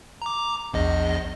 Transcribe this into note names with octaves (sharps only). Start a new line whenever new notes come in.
A#5 D6
A#1 E2 D#5